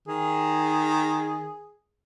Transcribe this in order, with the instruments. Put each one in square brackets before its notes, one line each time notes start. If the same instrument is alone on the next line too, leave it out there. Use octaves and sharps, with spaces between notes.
[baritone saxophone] D#3 [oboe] G#4